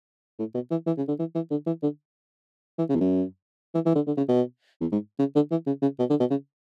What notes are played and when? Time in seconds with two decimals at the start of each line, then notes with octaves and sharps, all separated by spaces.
0.39 A2
0.55 B2
0.71 E3
0.87 E3
0.98 C#3
1.08 D3
1.19 E3
1.35 E3
1.51 D3
1.67 E3
1.83 D3
2.79 E3
2.90 C#3
2.95 E2
3.00 F#2
3.75 E3
3.86 E3
3.96 D3
4.07 D3
4.17 C#3
4.29 B2
4.81 E2
4.92 G#2
5.19 C#3
5.35 D3
5.51 E3
5.67 C#3
5.82 C#3
5.99 B2
6.10 D3
6.20 B2
6.30 C#3